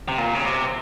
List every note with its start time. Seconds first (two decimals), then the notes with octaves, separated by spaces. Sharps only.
0.08 C3
0.18 A#2
0.35 C#3
0.45 C3